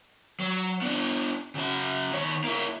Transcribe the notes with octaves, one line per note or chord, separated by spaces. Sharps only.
F#3
B3 D4
C#3 F#4
D#3 C#5
A#3 E4